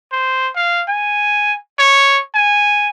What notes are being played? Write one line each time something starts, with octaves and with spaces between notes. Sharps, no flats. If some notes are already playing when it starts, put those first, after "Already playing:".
C5
F5
G#5
C#5
G#5